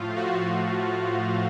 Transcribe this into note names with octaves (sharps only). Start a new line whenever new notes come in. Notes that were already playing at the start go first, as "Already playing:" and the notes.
Already playing: A2 F3 A3 F4
F#4